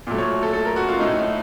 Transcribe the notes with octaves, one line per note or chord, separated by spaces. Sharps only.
A#2 F#3 A3
C#5
A4
A4
A#4
F#4
F4
A2 A3 D#4